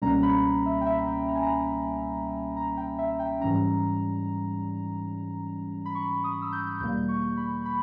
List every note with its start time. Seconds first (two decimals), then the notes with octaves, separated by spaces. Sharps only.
0.02 C#2 B2 G3 A#3 C#4 A#5
0.23 B5
0.66 E5
0.81 G5
0.86 E5
0.98 E5
1.08 G5
1.28 A#5
1.35 G#5
1.43 A#5
1.50 B5
2.57 A#5
2.77 G5
2.98 E5
3.19 G5
3.40 G#2 E3 G3 C#4 A#5
5.85 B5
5.95 C#6
6.24 D#6
6.42 E6
6.52 G6
6.80 E2 B2 G3 A#3 G6
7.09 C#6
7.37 B5
7.66 B5